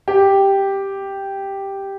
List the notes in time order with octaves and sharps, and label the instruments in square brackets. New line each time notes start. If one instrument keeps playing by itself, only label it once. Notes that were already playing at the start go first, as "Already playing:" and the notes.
[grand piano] G4